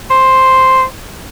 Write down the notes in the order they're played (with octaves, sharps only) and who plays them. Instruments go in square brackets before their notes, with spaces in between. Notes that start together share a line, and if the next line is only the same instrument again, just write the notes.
[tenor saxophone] C5